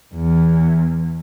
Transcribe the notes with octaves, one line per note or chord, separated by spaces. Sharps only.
E2